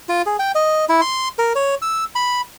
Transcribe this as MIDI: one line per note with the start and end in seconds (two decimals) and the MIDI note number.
0.09 0.22 65
0.26 0.37 68
0.39 0.52 79
0.55 0.85 75
0.89 1.01 64
1.01 1.28 84
1.39 1.53 70
1.55 1.75 73
1.82 2.04 88
2.15 2.41 83